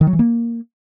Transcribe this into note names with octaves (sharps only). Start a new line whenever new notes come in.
D#3
F#3
E3
A#3